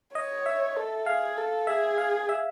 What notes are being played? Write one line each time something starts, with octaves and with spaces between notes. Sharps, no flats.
C#5 D#5
E5
A4
G#4 F5
A4
G#4 E5
F5
E5